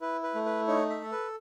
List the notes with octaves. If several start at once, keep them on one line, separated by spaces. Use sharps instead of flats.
E4 B4
B4
A3
B4
D#4 C#5
E5
A4
B4